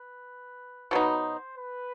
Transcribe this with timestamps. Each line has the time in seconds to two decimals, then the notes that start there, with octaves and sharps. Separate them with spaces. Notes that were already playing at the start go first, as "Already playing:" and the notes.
Already playing: B4
0.91 B2 F#3 B3 D#4 C5
1.56 B4